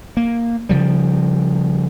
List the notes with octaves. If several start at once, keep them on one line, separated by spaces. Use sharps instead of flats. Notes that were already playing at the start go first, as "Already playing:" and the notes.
A#3
C#3 F3 G3